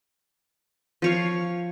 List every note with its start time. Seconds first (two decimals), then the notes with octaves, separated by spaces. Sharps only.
1.02 F3 C#5 F5